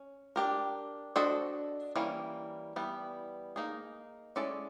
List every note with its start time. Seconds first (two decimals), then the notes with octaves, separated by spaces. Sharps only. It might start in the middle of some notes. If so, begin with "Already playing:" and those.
Already playing: C#4
0.36 D4 G4 A#4
1.16 D4 F#4 A4 C5 D#5
1.96 E3 G3 A#3 C#4
2.76 E3 G3 B3
3.56 A#3 D#4 G#4
4.36 G#3 C#4 E4 A4 D5